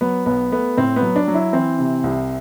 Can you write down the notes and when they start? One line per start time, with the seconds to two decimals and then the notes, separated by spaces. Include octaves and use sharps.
0.01 F#3 B3
0.26 B1 B3
0.52 A3 B3
0.77 A2 C4
0.96 B3
1.02 F#3
1.16 D4
1.28 F#3
1.34 E4
1.53 E3 C4
1.79 C3
2.04 C2